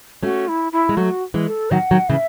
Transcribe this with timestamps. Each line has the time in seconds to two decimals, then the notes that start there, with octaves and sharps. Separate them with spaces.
0.23 A3 C#4 F#4
0.48 E4
0.72 E4
0.89 G#3
0.97 F#3 A3 F#4
1.34 E3 G#3
1.47 A4
1.71 D#3 F#3 F#5
1.91 D#3 F#3
2.09 C#3 E3 E5